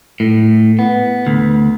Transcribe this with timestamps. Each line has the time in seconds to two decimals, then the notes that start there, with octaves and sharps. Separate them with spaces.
0.20 A2
0.79 B3
1.27 D2